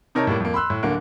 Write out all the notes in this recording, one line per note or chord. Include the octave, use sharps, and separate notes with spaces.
C3 D#4 A#4 C#5 A5
A2 G3 A#3
F2 A#3
B5 C6 E6 F#6
A2
D1 D3 A#3